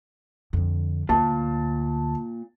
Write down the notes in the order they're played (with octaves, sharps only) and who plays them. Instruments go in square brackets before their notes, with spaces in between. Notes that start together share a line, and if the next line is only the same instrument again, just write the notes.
[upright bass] F2 D3
[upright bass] D2 [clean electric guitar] A#2 [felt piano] A5